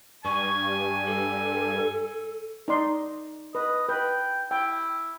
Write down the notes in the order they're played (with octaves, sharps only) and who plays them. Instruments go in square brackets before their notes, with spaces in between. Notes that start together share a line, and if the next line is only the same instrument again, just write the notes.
[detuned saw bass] G2 [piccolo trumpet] G#5 [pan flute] C#6
[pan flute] A4
[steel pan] D#4 D5 C6
[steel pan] B4 [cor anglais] D#5
[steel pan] B4 [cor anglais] G5
[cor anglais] E4 [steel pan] G5